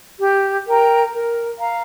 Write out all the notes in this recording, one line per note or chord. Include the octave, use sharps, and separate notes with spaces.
G4
A#4 G5 A#5
A#4
F5 A#5